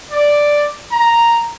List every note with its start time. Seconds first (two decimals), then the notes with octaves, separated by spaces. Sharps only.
0.11 D5
0.92 A#5